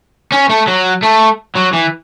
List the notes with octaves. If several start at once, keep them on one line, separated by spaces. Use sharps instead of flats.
C#4
A3
F#3
A3
F#3
E3